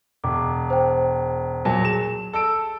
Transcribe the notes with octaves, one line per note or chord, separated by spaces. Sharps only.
E1 D6
C5 G5
A#2 F#3 A5
G#4 E7
A4 E6 D7